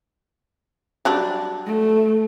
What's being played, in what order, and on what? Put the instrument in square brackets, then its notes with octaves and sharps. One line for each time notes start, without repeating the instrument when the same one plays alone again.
[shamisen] F#3 G3 D4
[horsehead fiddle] A3